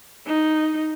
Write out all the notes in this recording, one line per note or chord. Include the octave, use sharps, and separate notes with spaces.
D#4